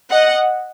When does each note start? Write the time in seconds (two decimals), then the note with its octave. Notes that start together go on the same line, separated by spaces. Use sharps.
0.11 D#5 F#5